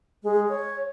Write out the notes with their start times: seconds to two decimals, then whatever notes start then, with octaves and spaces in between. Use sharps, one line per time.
0.23 G#3
0.49 C#5